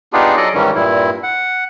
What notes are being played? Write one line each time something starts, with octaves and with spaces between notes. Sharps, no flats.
B3 D4 D#4 F4 G4 G#4
F#3 G#4 A4 D5 D#5
G#2 D#3 E3 G3 C#4
G2 A#2 E4
F#5